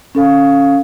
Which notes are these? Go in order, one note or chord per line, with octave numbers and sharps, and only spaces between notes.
C#4 A4 F5